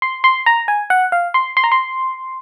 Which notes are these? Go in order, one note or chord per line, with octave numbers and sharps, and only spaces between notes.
C6
C6
A#5
G#5
F#5
F5
C6
C6
A#5
C6